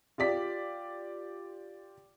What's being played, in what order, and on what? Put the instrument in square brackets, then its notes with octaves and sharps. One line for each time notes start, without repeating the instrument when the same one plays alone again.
[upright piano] F4 G4 D5 B6